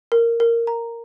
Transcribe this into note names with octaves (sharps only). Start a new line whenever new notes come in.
A#4
A#4
A#5